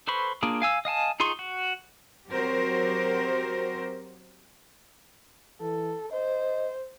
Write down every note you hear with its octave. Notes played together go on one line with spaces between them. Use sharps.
A4 B4 C5 B5 C#6
A#3 D4 F4 G#4
F5 G#5 E6
D#5 F5 G#5 A5
D#4 F4 G#4 C6 C#6
F#4
F#3 C4 F#4 G4 A#4 C5
E3 A4
C5 D#5